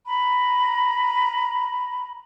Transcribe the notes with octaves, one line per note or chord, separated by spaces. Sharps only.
A#5 B5